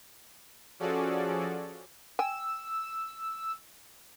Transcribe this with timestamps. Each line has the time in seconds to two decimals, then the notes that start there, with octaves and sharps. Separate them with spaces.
0.80 F3 C#4 F#4 G#4 A4 D5
2.19 G5 G#5 E6